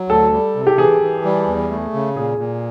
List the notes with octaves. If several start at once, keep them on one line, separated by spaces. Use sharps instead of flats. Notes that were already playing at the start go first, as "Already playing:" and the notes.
Already playing: F#3
D2 A4
G3
C3
G4
E3 G#4
E3
G3
E2
A3
C#3
A#2 G#4
A#2